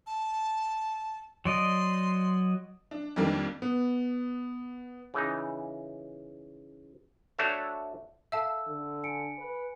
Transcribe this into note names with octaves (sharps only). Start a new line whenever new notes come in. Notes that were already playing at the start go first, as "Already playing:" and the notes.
A5
F#3 D5 D#5 C6
D4
F2 D#3 G3 A#3 D4
B3
C#3 E3 D#4
A3 D4 F#4 C#5 D5 E5
A4 E5 F5 A5 E6
D3
G#5 C#7 D7
B4